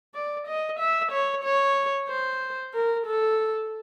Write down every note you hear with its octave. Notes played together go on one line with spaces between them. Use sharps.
D5
D#5
E5
C#5
C#5
C5
A#4
A4